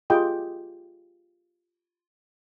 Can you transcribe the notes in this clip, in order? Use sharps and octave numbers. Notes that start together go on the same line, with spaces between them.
F4 G4 G#4 D#5 G5